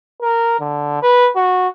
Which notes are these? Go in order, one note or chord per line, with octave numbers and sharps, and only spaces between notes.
A#4
D3
B4
F#4